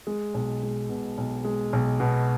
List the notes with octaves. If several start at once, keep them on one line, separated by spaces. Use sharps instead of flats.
G#3
B1
G#3
B2
B1
G#3
B1
B2